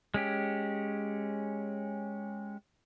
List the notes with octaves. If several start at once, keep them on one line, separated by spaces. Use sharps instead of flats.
G#3 C#4 G4